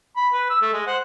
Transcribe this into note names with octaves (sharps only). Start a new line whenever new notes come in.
B5
B4
E6
A3
G#3
C5 F#5